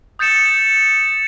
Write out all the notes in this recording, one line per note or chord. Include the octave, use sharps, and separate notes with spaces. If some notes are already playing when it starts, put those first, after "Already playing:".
D#6 G6 A6 C#7 E7